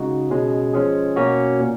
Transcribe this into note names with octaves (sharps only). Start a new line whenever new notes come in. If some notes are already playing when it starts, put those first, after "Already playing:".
Already playing: C#3 G#3 D#4 F#4
B2 G#3 C#4
F3 G#3 C#4 G#4
B2 A#3 C#4 F#4
A#2